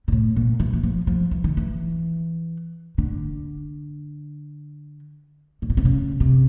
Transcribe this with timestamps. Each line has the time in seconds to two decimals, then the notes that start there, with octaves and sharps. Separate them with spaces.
0.08 A#2
0.12 A2
0.36 A#2
0.60 E3
0.73 E3
0.83 F3
1.07 F3
1.31 E3
1.44 D#3
1.57 E3
2.98 D3
5.62 A#2
5.70 B2
5.77 C3
5.85 C#3
6.20 C3